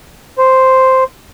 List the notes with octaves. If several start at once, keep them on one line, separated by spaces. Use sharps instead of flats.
C5